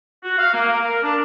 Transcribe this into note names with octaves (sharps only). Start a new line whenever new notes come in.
F#4
F5
A#3
A#4
D4